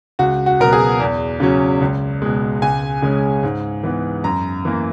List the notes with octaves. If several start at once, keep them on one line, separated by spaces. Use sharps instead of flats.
C#2 F#4
F#4
B2 F#3 B3 A#4
G#4
E2
C#3 F#3 C#4
C#2
B2 G#3
C#2 G#5
C#3 G#3 C#4
G#2
E3 B3
F#2 A#5
E3 A#3